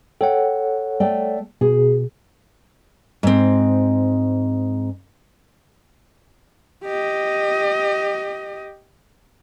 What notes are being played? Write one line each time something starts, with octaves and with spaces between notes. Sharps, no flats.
A4 C#5 F#5 G5
A3 D5 G5
B2 G#4
G#2 C4
G4 D#5